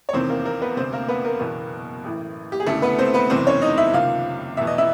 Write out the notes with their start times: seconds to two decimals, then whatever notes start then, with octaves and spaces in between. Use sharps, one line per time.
0.09 C#5
0.13 F1 E2 C3 D#3 C4 C5
0.29 A#3 A#4
0.45 A#3 A#4
0.62 B3 B4
0.77 E1 D2 C3 C4 C5
0.93 A#3 A#4
1.08 B3 B4
1.25 A#3 A#4
1.40 F#1 E2 B2
2.04 A1 A2 E3
2.52 G4
2.60 G#4
2.66 E1 D2 C#3 E3 A3 A4
2.82 B3 B4
2.98 C4 C5
3.14 B3 B4
3.30 F#1 E2 C3 E3 C4 C5
3.47 C#4 C#5
3.62 D#4 D#5
3.78 E4 E5
3.94 C#2 C3 D#3 F4 F5
4.57 F1 E2 B2 E5
4.67 D#5
4.78 E4 E5